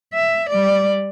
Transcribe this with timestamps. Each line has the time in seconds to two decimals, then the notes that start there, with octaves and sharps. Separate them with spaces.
0.14 E5
0.50 G3 D5